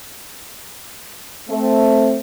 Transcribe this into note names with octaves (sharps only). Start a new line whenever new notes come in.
A3 C4